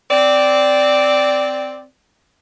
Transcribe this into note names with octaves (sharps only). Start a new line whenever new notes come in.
C4 D5